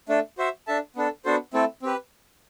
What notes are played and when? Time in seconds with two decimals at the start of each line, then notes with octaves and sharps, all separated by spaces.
0.09 A3 D4 A4
0.38 F#4 C5 E5
0.67 D4 A4 E5 A5
0.96 B3 D4 A4
1.25 B3 D4 F#4 A4 C5
1.54 A3 C4 E4 A4
1.82 C4 G4 B4